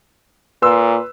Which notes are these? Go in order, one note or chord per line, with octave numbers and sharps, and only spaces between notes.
A#2 B4 C6 E6